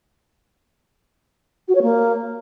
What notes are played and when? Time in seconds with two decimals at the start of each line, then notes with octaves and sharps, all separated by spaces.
1.68 F#4
1.75 C#5
1.82 A#3